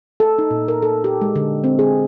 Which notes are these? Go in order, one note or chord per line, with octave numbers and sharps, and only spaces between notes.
A4
D#4
A#2
A#4
A4
G4
G#3
D3
C4
G#4